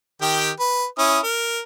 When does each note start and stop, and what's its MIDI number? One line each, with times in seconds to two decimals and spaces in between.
0.21 0.51 51
0.21 0.51 67
0.21 0.51 79
0.60 0.86 71
0.98 1.20 61
0.98 1.20 64
0.98 1.20 87
1.23 1.60 70